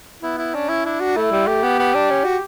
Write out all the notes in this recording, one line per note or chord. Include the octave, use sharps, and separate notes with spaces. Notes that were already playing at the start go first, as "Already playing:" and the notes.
B3 E4
E4
C#4 D4
E4
D4 E4
F#4
A3 E4
G3
A3 G4
B3
B3
D4
C#4
F#4